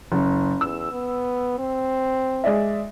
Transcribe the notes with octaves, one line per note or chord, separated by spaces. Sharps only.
F#1
E2 E6
B3
C4
G#3 D5 E5